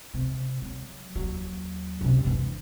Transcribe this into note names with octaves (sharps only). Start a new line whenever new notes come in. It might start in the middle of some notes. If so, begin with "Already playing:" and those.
C3
F#3
D#2 F#3
F#2 C3
E3 D4